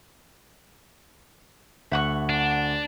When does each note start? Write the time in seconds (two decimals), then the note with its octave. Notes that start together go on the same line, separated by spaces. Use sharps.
1.92 D2 E5 F#5 C#6
2.29 D4